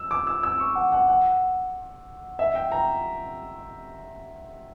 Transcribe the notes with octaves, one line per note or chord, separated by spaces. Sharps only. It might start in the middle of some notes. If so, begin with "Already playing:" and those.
Already playing: E6
D6
E6
E6
C#6
F#5
F#5
F#5
E5
G5
A#5